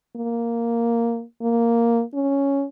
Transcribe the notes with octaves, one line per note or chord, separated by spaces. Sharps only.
A#3
A#3
C#4